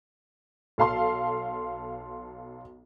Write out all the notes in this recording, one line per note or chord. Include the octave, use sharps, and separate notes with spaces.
B1 A4 F5 A5 C6